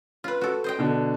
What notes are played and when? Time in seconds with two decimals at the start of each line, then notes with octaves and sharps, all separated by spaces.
0.24 F4 B4
0.41 F#4 A4
0.64 C5 D#5 G5
0.79 B2 D3